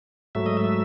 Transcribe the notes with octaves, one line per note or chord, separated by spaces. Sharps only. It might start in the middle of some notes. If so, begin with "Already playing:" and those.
G#2 F#3 A3 E5
D#5
E5